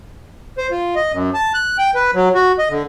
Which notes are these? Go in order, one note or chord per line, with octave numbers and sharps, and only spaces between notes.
C5
F4
D#5
F#2
A5
F#6
G5
B4
F#3
F#4
D#5
D3